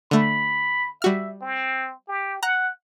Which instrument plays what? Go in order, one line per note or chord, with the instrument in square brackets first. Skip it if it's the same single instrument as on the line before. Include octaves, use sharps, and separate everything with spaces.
[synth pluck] D3 A3 [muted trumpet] B5
[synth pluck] G3 F#4 F6 [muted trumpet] E5
[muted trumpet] C4
G4
[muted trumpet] F#5 [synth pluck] A#5 F#6